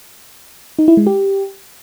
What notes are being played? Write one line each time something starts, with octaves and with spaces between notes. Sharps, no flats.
D#4
E4
G#3
G4